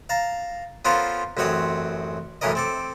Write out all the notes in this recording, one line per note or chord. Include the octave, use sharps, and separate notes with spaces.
F5 A5 A#5
B3 C#4 F4 A4 A#4 C5
A1 F#2 C4 F#4 C#5 D#6
F#2 A2 E3 C#4 A#4 D#5
C4 A4 D6